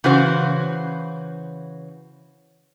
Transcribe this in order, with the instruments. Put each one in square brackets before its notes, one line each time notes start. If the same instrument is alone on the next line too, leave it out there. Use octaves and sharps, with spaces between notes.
[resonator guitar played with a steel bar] C#3 E3 F#4 C5